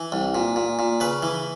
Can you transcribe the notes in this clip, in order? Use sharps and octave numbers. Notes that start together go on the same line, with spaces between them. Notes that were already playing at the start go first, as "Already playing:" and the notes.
Already playing: E3
C2
A#2
A#2
A#2
C#3 B4
E3